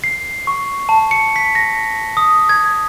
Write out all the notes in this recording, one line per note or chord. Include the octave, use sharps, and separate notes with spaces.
C7
C#6
A5
C#7
B6
A#6
D#6
G#6